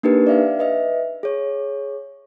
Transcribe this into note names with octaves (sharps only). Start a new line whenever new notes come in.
A#3 D4 D#4 G4 A#4 B4
D5 E5 F5
B4 D#5 E5
G#4 C#5